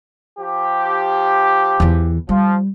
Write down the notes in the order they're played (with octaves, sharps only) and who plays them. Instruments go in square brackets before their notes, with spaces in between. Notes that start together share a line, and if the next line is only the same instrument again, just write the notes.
[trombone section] F3 G4
[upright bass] E2 E3
[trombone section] F3 [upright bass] G3